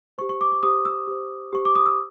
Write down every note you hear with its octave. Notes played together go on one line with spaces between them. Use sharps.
G4 C5 C#6
C#6
D6
D6
G4 C5 D#6
E6
G4 C5
G4 C5 C#6
D6
D#6
E6